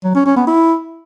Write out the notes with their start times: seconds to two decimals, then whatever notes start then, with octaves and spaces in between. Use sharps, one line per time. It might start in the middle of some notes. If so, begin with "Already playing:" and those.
0.04 F#3
0.15 C#4
0.25 C#4
0.36 B3
0.47 E4